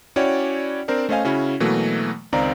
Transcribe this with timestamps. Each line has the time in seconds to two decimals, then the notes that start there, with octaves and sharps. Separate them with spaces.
0.16 C#4 E4 F#4 C#5 D5 G5
0.88 C4 D4 A#4 C5 D5
1.09 A3 C#4 C5 D#5 F5 G#5
1.24 C#3 C#4 E4 F#4
1.60 B2 E3 F#3 A3 A#3
2.33 C#2 D#3 C4 D5 F5 A#5